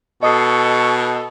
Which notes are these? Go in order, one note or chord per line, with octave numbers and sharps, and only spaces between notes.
B2 A4 D#5 C#6 D#6 C7